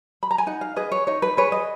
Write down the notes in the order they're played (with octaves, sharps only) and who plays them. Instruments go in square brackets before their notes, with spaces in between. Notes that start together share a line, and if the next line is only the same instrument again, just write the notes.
[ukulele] B5
A#5
G#5
D#4 F#5
F5
G#4 B4 D#5
C#5
D#4 C#5
B4
G#4 B4 C#5
D#5